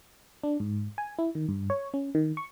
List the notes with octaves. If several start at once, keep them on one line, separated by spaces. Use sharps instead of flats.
D4
G#2
G#5
E4
D#3
G2
C#5
C#4
D#3
C#6